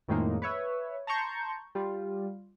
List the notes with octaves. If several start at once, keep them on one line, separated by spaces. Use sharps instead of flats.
F2 A2 D#3 G#3 A#3 D#4
B4 C#5 E5
A5 A#5 C6 C#6 G6
G3 F4